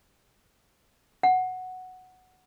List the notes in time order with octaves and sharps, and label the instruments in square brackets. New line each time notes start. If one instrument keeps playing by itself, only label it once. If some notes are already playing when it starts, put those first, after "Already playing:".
[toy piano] F#5